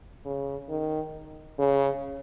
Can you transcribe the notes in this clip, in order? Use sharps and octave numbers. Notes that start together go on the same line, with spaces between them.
C#3
D#3
C#3